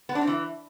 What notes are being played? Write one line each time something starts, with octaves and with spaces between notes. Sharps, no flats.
B3
D4
C4
E3